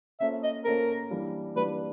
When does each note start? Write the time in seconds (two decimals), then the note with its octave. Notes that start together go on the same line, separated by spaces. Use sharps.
0.20 A#3 C#4 F4 A4 C5 E5
0.43 D#5
0.65 A#3 C#4 F4 A4 A#4 C5
1.10 E3 G3 A#3 D4 F4
1.55 E3 G3 A#3 D4 F4 B4